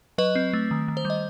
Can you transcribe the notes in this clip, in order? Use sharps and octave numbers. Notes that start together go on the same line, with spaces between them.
F#3 B4 D#5
C4
A3
D#3
D#3
C5
G3
D#5